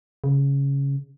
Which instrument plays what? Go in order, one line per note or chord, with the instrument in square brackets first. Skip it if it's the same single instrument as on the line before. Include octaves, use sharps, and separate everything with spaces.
[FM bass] C#3